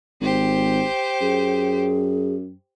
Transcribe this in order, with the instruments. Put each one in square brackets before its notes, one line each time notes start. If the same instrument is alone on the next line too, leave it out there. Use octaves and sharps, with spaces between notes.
[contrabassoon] G#1 [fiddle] G4 C5
[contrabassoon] F#2 [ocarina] G#4